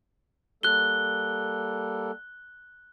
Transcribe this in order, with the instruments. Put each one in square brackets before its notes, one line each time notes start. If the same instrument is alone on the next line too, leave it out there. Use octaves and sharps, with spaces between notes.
[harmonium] G3 A#3 A4 [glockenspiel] F#6 G7